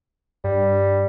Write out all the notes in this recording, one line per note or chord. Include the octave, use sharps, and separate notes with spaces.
G2 G3